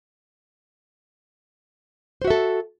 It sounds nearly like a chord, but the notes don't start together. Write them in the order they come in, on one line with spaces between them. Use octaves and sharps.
C5 F#4 E5 A4